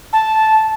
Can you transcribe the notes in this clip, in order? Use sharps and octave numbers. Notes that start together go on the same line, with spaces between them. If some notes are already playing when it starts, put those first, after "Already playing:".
A5